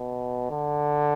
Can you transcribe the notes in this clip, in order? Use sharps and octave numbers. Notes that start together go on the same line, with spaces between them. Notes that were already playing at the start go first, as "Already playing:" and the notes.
Already playing: B2
D3